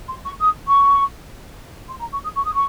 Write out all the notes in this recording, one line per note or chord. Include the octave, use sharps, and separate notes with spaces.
C6
C#6
D#6
C#6
C6
A#5
C#6
D#6
C#6
D#6
C#6